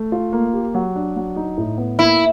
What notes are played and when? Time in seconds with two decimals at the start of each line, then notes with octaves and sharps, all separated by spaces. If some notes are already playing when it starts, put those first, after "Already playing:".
Already playing: A3
0.12 F4
0.33 A#3
0.53 G4
0.74 F#3
0.96 D4
1.16 F#3
1.36 D#4
1.58 A2
1.78 B3
1.99 A#3 E4